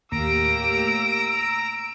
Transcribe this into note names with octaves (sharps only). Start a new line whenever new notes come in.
D#2 A2 A#3 G4 A#5 E6 D7